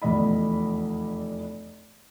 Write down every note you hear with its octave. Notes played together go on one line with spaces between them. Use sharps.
F1 E2 D5 D#5 B5